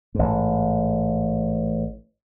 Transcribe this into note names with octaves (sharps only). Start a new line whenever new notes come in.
A1 G#2